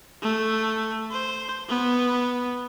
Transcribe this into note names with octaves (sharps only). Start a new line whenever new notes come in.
A3
C5
B3